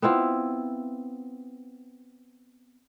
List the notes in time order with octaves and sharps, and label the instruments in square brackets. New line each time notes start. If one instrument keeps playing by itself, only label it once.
[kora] B3 C4 E4 F4